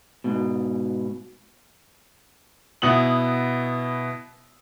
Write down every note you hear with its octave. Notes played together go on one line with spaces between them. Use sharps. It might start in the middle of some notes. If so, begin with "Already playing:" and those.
G#2 B2
B2 B3 E4 D#6 F#7